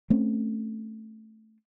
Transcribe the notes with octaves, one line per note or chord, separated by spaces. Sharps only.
A3 C4 C#4